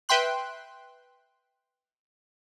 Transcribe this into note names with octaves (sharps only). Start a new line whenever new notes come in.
B4 E5 G5 C6 F#6